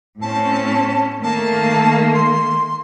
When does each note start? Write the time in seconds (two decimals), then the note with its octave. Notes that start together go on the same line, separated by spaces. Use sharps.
0.21 A2 C4 C#4 A5
1.23 D#3 A3 A#3 A5
2.14 C6